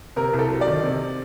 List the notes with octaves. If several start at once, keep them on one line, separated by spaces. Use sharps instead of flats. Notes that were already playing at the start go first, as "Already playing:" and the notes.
C3 A#4
C2
A4
F#3
D5
D#3
C3